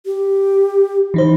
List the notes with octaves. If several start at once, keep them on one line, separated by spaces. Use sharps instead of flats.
G4
E3 D#4 C5